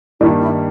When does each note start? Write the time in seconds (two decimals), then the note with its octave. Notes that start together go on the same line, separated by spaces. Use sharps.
0.20 G2 D#3 G3 A#3 E4
0.41 E4